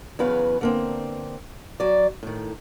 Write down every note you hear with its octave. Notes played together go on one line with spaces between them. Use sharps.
E2 C#3 F#3 B4 F5
D3 A#3 C4
F#3 D5
A2 D#3